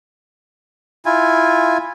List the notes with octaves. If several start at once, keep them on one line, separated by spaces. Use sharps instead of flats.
E4 F4 G#5